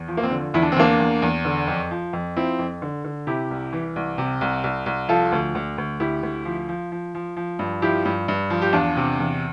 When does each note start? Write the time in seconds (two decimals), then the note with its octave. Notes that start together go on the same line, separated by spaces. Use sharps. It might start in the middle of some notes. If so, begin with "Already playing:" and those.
Already playing: E2
0.08 F3
0.17 A#3
0.23 C4
0.31 D3
0.54 E2 E4
0.62 D4
0.72 C4
0.76 E2 A#3 D4
1.00 E2
1.22 E2
1.45 D3
1.67 F2
1.91 F3
2.13 F2
2.36 F3 C4 E4
2.59 F2
2.82 D3
3.04 D3
3.27 C3 E4 G4
3.50 C2
3.73 E3
3.96 C2
4.18 C3
4.41 C2
4.64 C2
4.86 C2
5.09 F3 F4 A4
5.32 D2
5.55 D2
5.78 D2
6.00 D2 E4 G4
6.23 D2
6.45 F3
6.69 F3
6.92 F3
7.15 F3
7.37 F3
7.59 G2
7.82 F3 E4 G4
8.05 G2
8.28 G2
8.50 F3
8.62 G4
8.73 E2 D4 F4
8.96 C3
9.19 E2